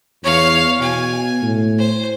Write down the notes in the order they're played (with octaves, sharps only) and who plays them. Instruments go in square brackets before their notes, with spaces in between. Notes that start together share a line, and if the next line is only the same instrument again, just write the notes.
[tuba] E2 [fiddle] C#5 F5
[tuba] B2 [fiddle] G#5
[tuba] A2
[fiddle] C5